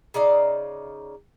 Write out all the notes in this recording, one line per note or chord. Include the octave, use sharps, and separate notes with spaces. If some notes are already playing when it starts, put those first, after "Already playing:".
C#3 D#4 D5 F5